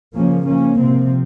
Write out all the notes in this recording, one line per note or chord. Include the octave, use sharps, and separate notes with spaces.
C#3 F3 A#3 C#4
F3 A#3 C#4
C3 F3 C4